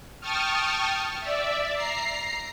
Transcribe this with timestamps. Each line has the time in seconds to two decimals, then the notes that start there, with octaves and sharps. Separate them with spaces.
0.21 G5 A5 C#6 D#6 F6
1.20 D5 E5
1.75 A#5 C7